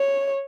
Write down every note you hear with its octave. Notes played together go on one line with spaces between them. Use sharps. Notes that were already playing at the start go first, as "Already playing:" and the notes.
Already playing: C#5